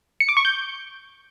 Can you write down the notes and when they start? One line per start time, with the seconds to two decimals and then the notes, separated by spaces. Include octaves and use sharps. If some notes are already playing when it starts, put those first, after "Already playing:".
0.20 C#7
0.29 D6
0.37 C#6
0.45 G6